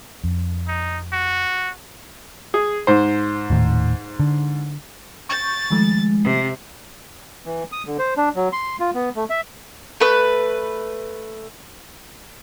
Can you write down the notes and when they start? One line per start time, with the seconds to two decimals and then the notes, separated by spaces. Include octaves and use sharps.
0.24 F2
0.68 D#4
1.13 F#4
2.54 G#4
2.87 G#2 C5
3.50 D#1 A2 D#3
4.20 D3
5.29 C#6 G6 A6
5.70 D#3 F3 G#3 A3
6.23 C3
7.46 E3
7.72 D#6
7.87 D3
7.99 C5
8.17 D4
8.36 F#3
8.53 C6
8.80 F4
8.94 B3
9.16 A3
9.30 E5
10.00 A3 B4